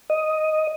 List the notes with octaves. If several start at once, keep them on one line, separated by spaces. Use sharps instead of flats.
D#5